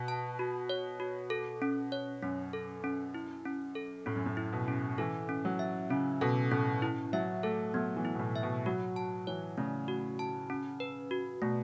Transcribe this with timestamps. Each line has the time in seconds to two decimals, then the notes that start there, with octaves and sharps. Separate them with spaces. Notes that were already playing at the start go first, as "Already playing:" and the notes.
Already playing: B2 F#4
0.08 A5
0.39 F#4
0.69 C#5
1.00 F#4
1.30 A4
1.62 C#4
1.92 C#5
2.22 F#2 C#4
2.53 A4
2.84 C#4
3.14 E4
3.45 C#4
3.75 A4
4.06 A2 C#4
4.16 F#2
4.26 A2
4.37 E4
4.53 B2
4.68 C#4
4.98 E3 A4
5.29 C#4
5.45 F#3
5.59 E5
5.90 C#3 C#4
6.21 B2 A4
6.51 A2 C#4
6.82 E4
7.13 F#3 E5
7.43 A3 A4
7.74 F#3 B3
7.96 E3
8.05 E4
8.15 B2
8.19 A2
8.36 E5
8.43 B2
8.66 F#3 F#4
8.96 A5
9.27 E3 C#5
9.58 C#3 A3
9.88 F#4
10.19 A5
10.50 C#4
10.80 B4
11.11 F#4
11.42 B2 A3